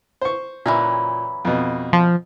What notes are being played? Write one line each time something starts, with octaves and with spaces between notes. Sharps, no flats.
C5 C#6
A#2 E3 F#3 C#4
F2 B2
F3